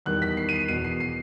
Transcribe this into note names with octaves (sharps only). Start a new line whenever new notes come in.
E2 D#3 G3 F#6
B6
C7
D#7
C7
E1 E2 B2 D#7
C7
C7